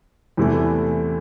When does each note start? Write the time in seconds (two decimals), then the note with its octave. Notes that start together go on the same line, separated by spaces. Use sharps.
0.37 E2 C3 E3 A3